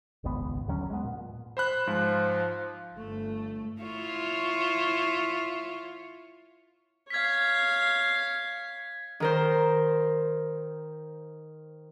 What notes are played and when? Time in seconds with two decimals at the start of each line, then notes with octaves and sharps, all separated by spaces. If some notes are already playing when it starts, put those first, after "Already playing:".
0.24 D#1 G#1 C#2 B3
0.68 D#2 D3 F#3 C#4
0.90 G#3 B3
1.04 A#2
1.57 C5 B5 F#6
1.87 G#2 F3
2.94 G1 A3
3.81 E4 F4 C#5
7.10 C#5 F5 G#6 B6
9.20 D#3 A#4 C5